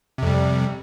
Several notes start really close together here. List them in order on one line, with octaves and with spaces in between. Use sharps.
C3 F2 G3